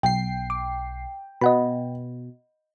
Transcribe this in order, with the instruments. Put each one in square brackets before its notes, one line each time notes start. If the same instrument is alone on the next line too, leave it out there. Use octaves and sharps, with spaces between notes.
[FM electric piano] B1 C7 [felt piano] G5
[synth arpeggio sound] D6
[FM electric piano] B2 [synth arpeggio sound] D#5 F#5 B5